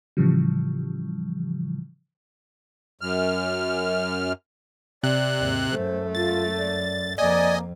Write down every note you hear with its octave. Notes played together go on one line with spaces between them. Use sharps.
A2 C#3 E3 F3 G3
F#2 F6
C3 D5 F#6
D#2 G#2
F#2 A3 C5
F4 A6
D5
F2 A#3 D5 D#5 G#5